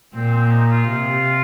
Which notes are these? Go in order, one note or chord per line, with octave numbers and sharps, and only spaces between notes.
A#2 C4
C4
D#4
D#4
F4
C3